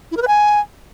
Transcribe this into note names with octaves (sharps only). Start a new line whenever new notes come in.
E4
A#4
B4
G#5